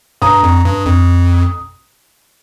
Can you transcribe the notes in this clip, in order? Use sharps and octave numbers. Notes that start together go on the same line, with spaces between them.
G2 A#5 D#6
F2
G2
F2